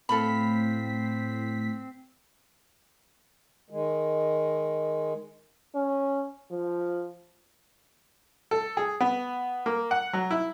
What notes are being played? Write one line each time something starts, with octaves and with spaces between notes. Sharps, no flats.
A2 C4 A4 F5 B5 B6
D#3 G#3
C#4
F3
A4
G#4
B3
A#3
F#5
F#3
E4